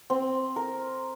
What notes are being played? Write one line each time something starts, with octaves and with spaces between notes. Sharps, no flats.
C4
A#4